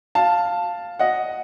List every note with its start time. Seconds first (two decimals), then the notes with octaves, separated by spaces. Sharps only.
0.15 F5 A5
0.99 D#5 F#5